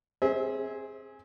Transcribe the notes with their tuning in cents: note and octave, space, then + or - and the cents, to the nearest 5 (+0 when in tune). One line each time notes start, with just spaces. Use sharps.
C4 +15 G#4 +0 E5 -35